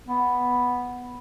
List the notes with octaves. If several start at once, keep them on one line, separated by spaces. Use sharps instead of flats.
B3